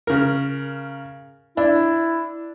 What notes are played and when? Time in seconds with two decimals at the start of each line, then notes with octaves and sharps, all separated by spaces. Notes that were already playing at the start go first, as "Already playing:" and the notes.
0.07 C#3 A#4
1.57 D4 E4